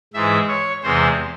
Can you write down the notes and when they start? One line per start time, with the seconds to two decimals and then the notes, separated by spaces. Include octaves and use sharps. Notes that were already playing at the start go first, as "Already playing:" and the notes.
0.14 G#2 E3 G#3 E5
0.49 C#5
0.83 E2 C3 E3 G#3 C5